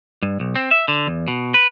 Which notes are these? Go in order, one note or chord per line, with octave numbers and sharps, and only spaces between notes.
G2
B1
C4
E5
D3
E2
B2
B4